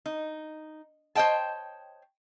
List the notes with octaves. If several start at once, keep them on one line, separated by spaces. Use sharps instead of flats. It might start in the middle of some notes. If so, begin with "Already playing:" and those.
D#4
C5 C#5 D#5 G5 A5